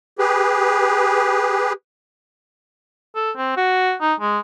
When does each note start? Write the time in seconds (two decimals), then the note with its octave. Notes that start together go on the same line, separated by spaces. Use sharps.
0.19 G4 G#4 B4
3.16 A4
3.37 C4
3.57 F#4
4.01 D#4
4.20 G#3